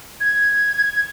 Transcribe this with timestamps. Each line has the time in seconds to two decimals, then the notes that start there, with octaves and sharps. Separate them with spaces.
0.20 G#6